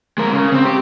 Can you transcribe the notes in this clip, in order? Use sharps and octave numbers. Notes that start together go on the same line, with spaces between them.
G#3 A#4
C#3
C4
G4